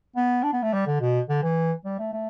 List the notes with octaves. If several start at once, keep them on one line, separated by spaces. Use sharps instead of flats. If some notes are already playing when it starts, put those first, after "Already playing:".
B3
D4
B3
A3
G3
D3
B2
D3
E3
G3
A3
A3